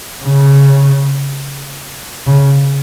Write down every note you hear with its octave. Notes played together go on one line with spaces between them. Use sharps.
C#3
C#3